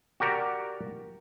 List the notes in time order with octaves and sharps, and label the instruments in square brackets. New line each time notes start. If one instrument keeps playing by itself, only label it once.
[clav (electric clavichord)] F#4 G4 A#4 D5